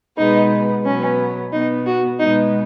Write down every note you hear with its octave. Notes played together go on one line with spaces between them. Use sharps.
B2 G#3 B3 D#4
B2 F#3 B3 C#4
B2 B3 D#4
F#4
B2 G#3 B3 D#4